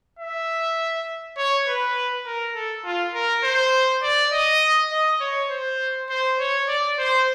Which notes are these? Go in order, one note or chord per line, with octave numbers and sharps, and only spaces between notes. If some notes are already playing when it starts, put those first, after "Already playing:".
E5
C#5
B4
A#4
A4
F4
A#4
C5
D5
D#5
D#5
C#5
C5
C5
C#5
D5
C5